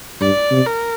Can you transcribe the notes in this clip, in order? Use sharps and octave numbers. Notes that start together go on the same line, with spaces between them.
G2 D5
C3
A#4